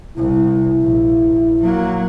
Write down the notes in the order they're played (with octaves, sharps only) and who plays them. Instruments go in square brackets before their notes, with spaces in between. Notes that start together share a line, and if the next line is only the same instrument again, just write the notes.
[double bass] C2 [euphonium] E4
[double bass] A#1
F#3 A#3